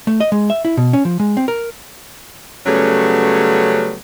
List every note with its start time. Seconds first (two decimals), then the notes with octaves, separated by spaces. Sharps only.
0.07 A3
0.20 D#5
0.32 G#3
0.50 E5
0.65 E4
0.77 B2
0.93 C#4
1.05 F3
1.20 G#3
1.37 C4
1.48 A#4
2.66 C#3 F#3 G3 A3 B3 C#4